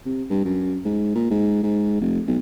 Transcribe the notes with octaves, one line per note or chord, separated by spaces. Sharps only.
C3
G2
F#2
G#2
A#2
G#2
G#2
F1
B1